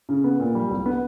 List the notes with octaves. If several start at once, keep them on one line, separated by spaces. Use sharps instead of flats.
C#3
B3
A#2
G3
C2
B3